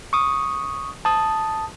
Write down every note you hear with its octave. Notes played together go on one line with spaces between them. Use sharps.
C#6 D#6
A5 D#6